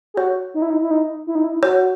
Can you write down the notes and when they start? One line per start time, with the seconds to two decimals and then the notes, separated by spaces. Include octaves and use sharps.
0.14 G#4
0.17 F#4 C#5
0.54 D#4
0.62 E4
0.70 D#4
0.82 E4
0.91 D#4
1.27 E4
1.35 D#4
1.44 E4
1.63 F#4 C#5